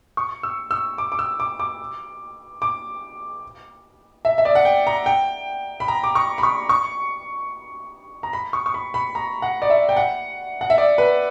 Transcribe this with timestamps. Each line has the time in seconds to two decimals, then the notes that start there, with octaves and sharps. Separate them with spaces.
0.17 C#6
0.43 E6
0.71 E6
0.98 D6
1.12 D6
1.19 E6
1.40 D6
1.59 D6
2.62 D6
4.25 E5
4.38 E5
4.45 D5
4.55 F#5
4.65 G5
4.87 A#5
5.06 G5
5.80 B5
5.88 A#5
6.04 D6
6.15 C#6
6.38 B5
6.43 C#6
6.69 C#6
8.23 A#5
8.33 B5
8.53 C#6
8.66 C#6
8.74 B5
8.94 B5
9.15 A#5
9.42 F#5
9.62 D5
9.70 E5
9.89 G5
9.96 F#5
10.61 F#5
10.70 E5
10.78 D5
10.98 B4